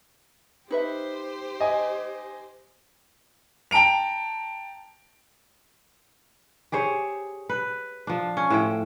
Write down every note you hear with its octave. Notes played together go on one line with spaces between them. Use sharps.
D#4 G4 B4 C5 E5
D#5 G#5
G5 A5 A#5 D7 F7
G4 G#4 C5 C#5
B4
F3 D4
C#4
A2 C5 G5